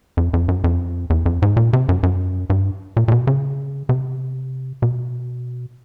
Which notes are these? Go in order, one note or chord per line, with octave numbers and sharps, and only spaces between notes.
F2
F2
F#2
F2
E2
F2
G#2
A#2
C3
F#2
F#2
G2
A#2
A#2
B2
C#3
C3
B2